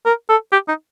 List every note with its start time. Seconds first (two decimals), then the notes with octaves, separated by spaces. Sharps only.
0.06 A#4
0.29 A4
0.52 G4
0.68 D#4